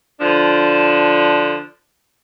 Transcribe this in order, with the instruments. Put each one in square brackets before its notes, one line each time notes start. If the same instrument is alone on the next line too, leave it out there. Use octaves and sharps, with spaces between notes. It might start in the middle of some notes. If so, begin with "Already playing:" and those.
[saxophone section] D3 F3 D4